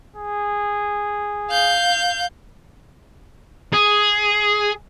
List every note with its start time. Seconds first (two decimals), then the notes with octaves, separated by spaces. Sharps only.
0.17 G#4
1.50 F5 G6
3.73 G#4